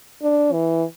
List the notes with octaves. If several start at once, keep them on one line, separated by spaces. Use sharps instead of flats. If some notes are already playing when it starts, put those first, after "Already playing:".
D4
E3